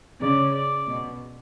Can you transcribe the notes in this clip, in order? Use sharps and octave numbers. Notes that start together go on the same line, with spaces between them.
C#3 D5
D5
B2